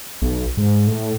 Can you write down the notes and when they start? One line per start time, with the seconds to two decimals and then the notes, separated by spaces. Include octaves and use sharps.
0.22 B1
0.57 G#2
0.87 A2